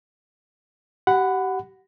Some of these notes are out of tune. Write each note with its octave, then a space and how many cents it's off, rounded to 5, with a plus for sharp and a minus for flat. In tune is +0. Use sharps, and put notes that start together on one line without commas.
G4 -30 F#5 +0 B5 +20